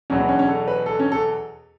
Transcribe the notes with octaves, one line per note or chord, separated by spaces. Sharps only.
E2 B2 F#3 C#4
B3
C#4
C#4
A4
B4
A4
C#4
A4